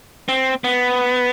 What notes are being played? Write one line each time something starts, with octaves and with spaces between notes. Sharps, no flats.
C4
B3